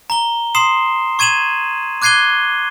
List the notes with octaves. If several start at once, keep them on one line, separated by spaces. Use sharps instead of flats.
A#5 G7
C6 D#6 C7 E7
C#6 G#6 D#7 E7 F#7
D6 F#6 G#6 C7 D#7 G7